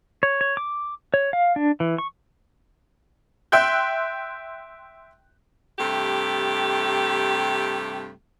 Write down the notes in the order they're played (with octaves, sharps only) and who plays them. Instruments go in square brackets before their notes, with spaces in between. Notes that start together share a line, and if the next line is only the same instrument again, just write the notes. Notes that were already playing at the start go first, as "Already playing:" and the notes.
[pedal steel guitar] C#5
C#5
D6
C#5
F5
D4
E3
C#6
[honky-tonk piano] E5 G5 C6 F#6 G6
[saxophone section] G2 C3 A3 G4